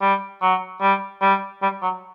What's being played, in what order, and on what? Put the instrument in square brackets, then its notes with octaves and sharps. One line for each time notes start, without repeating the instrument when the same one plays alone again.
[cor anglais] G3
F#3
G3
G3
G3
F#3